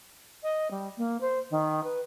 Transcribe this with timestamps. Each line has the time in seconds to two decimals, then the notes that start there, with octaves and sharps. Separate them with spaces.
0.43 D#5
0.70 G3
0.97 A#3
1.20 C5
1.50 D#3
1.83 B4